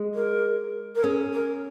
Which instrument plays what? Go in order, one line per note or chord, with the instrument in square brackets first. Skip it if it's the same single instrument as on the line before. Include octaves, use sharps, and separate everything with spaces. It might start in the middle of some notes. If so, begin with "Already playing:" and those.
Already playing: [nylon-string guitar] G#3
[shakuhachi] A#4
A#4
[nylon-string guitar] C#4 [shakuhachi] G#4
[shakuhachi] A#4